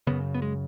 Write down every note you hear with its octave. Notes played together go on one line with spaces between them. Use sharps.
F#2 C#3 B3
B3
G#3